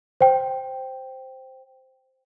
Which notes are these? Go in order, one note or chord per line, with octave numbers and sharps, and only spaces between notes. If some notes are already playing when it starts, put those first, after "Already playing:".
C5 G5